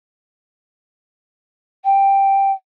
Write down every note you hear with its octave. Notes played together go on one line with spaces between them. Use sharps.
G5